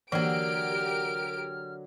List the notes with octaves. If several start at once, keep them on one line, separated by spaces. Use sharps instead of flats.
D3 E3 F#3 A#3 G4 A#4 F6 D7